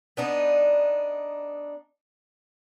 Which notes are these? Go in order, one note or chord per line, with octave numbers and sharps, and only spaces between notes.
B3 D4 D#4